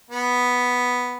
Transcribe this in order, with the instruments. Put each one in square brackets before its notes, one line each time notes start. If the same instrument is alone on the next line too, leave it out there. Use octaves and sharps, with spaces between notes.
[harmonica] B3